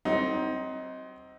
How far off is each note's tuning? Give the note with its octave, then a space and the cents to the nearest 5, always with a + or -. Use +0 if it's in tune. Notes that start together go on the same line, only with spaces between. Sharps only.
F#3 +35 C4 +0 D#4 +20